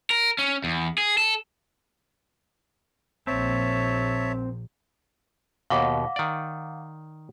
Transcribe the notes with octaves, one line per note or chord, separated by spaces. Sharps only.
A#4
C#4
E2
G#4
A4
A#1 C4 C#5 E5 A5
D#2 B2 F5 F#5 D6
D#3 D5